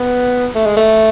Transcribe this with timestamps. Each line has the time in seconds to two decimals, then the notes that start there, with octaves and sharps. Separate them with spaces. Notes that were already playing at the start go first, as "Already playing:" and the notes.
Already playing: B3
0.55 A3
0.66 G#3
0.77 A3